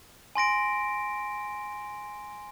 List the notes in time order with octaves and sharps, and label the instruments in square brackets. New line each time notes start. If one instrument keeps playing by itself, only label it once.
[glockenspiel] G#5 C6 A#6 D7